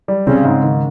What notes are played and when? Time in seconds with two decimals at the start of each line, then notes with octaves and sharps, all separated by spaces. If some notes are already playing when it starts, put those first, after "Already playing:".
0.08 G3
0.26 C#3 C4
0.45 G#2
0.63 D#3